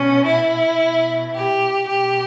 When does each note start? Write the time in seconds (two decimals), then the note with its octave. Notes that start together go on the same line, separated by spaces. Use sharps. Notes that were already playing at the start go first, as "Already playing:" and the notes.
Already playing: B2 C#4
0.27 E4
0.81 B2
1.35 G4
1.89 B2 G4